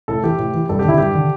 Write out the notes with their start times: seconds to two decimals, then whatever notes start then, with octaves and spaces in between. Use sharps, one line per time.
0.08 A2 A4
0.23 E3 G4
0.39 A2
0.54 E3
0.69 G2 A4
0.79 G4
0.84 D3 E4
0.98 G2 G4
1.15 D3